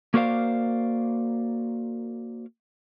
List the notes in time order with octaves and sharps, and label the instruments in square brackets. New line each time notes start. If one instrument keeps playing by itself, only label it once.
[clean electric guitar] A#3 F#4 A#4 C5 D5 F5